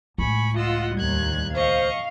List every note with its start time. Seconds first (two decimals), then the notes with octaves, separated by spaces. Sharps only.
0.18 C#2 A2 G#5 B5 C#6
0.56 F4 D#5 F#5 E6
0.97 D#2 G3 F#6 G#6
1.55 C5 D#5 F5 C#6